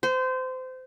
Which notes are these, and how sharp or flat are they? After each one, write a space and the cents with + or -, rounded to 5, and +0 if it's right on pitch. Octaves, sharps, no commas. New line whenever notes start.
C5 -25